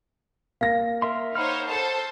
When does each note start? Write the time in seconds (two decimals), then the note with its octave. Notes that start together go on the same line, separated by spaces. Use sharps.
0.61 A#3 F5 A#6
1.02 A#4 E5 C6
1.35 D#4 C5 C#5 F#5 B5 F6
1.67 A4 C5 A5